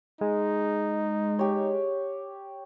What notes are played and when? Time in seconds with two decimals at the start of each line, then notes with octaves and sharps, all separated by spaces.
0.21 G#3 D#4
1.39 G4 C#5